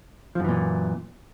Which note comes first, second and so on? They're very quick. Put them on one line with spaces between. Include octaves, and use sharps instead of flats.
F3 F#2 E3 A#2